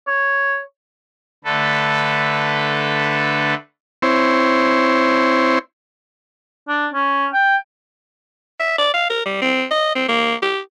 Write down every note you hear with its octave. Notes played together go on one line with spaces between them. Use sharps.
C#5
D3 A3 A4 B4
C4 E4 C5 C#5
D4
C#4
G5
E5
D5
F5
A#4
G3
C4
D#5
C4
A#3
G4